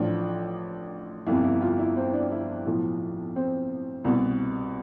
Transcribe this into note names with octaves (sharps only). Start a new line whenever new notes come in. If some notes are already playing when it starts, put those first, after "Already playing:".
Already playing: A1 A2 F3 D4
G1 F2 C3 E4
E4
F4
E4
C4
D4
E4
B1 A2 F3
C4
C2 B2